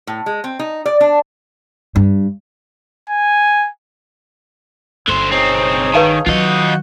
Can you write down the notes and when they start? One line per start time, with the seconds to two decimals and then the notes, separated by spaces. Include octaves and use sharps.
0.07 A2
0.26 G#3
0.44 C4
0.59 D#4
0.86 D5
1.01 D4
1.96 G2
3.09 G#5
5.08 G1 D3 C5
5.31 B1 C4 D#4 G#4 C#5
5.94 D#3 B4 F5 A5
6.26 D#3 F#3 F4 F#4 D#5 F#5 G6